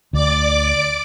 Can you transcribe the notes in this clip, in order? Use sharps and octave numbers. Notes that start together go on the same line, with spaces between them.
D2 D5 D6